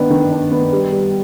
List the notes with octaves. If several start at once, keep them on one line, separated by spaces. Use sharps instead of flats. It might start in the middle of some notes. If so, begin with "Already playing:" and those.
Already playing: D#3 B3 D4
D#3
D4
B3
G3
G3